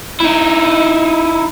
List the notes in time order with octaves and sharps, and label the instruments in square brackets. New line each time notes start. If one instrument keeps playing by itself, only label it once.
[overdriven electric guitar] D#4 E4